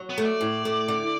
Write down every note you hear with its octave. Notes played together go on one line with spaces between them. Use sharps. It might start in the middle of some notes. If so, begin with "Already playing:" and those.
Already playing: F#3
B3
A3
D5
A2
A3
D3